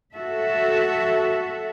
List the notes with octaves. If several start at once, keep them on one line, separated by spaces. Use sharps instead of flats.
F#4 A4 E5